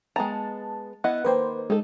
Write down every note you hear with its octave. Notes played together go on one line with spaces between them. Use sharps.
G#3 B3 A5 A#5
B3 E4 D#5 F#5
D#3 A#3 B4 C5
G#3 D#4 A4